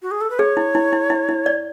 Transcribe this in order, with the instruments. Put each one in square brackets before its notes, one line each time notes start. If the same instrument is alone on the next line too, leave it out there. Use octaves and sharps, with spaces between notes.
[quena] F#4
G#4
A4
B4
[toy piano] G#4 [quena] C#5
[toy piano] E4
E4
E4
E4
E4
D5